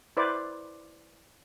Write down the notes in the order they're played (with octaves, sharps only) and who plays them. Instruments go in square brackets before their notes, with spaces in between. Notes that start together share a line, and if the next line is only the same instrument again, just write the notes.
[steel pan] E4 B4 C5 D5